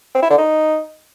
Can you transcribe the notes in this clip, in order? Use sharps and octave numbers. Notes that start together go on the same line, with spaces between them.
C4
E4
D3
D#4